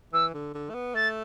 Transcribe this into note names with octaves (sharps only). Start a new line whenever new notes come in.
E3 E6
D3
D3
A3
B3
A3 A6